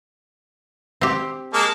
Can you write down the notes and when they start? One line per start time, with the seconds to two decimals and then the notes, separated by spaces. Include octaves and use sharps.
1.01 C4 G4
1.53 G#3 A#3 A5